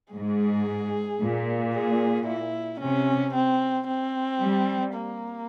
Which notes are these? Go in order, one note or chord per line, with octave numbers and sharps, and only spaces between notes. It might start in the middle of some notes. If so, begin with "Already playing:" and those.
G#2 G#4
A#2
G#4
E4
C3 C#4
C4
C4
G3
A#3